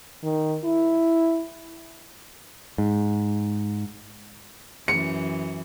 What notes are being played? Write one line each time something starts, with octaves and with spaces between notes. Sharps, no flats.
D#3
E4
G#2
F#2 E3 C#7